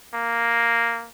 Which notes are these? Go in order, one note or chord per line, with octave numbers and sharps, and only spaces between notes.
A#3